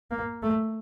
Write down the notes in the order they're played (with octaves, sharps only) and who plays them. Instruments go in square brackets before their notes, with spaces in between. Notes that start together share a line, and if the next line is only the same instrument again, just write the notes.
[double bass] A#3
A3